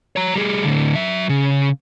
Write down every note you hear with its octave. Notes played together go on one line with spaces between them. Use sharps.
C#5 A#5
G3 G#4
A2 D3
F#3 E5
C#3